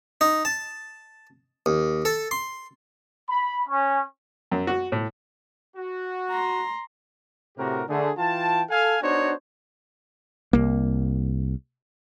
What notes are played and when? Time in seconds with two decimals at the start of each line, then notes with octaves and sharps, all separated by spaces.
0.21 D#4
0.45 A5
1.66 D#2
2.05 A4
2.31 C6
3.29 B5
3.68 C#4
4.52 F#2
4.67 F#4
4.92 A2
5.76 F#4
6.31 A#5 C6
7.58 A2 C3 F#4 G4 A#4
7.89 D3 A3 G#4
8.18 E3 F4 G5 A5
8.70 A4 F5 G#5
9.02 B3 D4 D#4 F#4 C5 C#5
10.53 C2 A#3